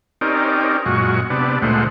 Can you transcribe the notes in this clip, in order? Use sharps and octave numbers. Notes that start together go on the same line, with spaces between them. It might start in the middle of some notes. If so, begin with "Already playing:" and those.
C4 C#4 D#4 G4 A#4 D5
F#2 A#2 G#3 F#4 C#6
C3 B3 D4
D2 A#2 G#3 A3 C5 F#5